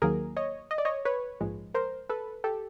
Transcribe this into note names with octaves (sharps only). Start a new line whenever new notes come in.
D#2 D#3 F#3 A#3 G#4 A#4
C#5 D#5
D#5
D5
C#5 D#5
B4 C#5
A#1 G#2 F3 G#3
A#4 C5
A4 B4
G4 A4